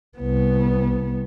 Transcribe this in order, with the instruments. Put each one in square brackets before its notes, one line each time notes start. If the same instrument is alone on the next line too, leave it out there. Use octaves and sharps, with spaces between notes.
[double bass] C2 B3